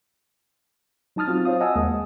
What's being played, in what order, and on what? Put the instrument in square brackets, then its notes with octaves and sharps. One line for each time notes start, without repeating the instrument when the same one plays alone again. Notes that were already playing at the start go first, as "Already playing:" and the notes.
[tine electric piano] F#3 D#4 A5 D#6 F6 A6
C4 F4 F#4
C5 C#5 F5 D#6
D#5 F#5 G#5 A5 D#6 E6
D#2 G#3 A#3
G#3